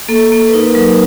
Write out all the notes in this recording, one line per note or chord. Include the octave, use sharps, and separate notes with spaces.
A#3 A4
A#3
B4
D#4 A#4
F#3 A#4